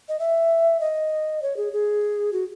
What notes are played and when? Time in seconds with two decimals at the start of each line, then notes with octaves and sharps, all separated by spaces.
0.09 D#5
0.19 E5
0.80 D#5
1.42 C#5
1.57 G#4
1.73 G#4
2.33 F#4